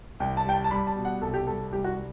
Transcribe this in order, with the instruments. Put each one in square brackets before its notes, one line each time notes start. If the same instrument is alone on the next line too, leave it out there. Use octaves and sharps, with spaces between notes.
[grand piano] C2 [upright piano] G5
[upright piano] A5
[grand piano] G3 [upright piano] G5
[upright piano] A5
A5
[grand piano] G3 [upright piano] B5
[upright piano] A5
[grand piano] B2
[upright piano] F#5
[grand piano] C2 [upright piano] A4
[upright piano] G4
[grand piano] G3 [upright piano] A4
[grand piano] C2 [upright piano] G4
[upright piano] F#4
[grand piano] G3